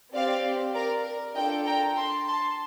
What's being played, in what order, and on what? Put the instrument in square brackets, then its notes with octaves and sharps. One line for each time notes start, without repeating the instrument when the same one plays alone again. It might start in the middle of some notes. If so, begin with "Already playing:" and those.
[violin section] C4 G4 D5 F5
A#4 D5
A#4
D4 F4 A4 D#5 G5
G5 A#5
A5 C6
A5 C6